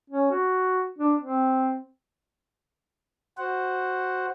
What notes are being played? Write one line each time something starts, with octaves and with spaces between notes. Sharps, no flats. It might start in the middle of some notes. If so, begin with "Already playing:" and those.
C#4
F#4
D4
C4
F#4 C5 F#5